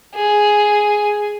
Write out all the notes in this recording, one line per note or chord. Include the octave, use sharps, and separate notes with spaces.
G#4